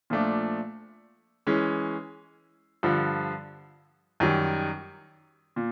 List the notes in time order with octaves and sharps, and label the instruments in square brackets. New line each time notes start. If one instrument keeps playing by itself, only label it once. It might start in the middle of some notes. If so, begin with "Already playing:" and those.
[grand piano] A#2 F3 A3 D4
E3 G#3 C#4
G2 D3 F3
F#2 D#3 G3
A#2